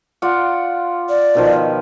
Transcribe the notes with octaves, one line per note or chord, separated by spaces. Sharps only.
F4 D5 F#5
D5
B2 D#3 F3